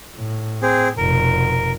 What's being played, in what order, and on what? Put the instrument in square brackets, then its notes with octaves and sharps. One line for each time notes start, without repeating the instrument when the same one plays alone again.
[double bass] A2
[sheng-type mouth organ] C4 G#4
[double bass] F1 B2 [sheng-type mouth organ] A#4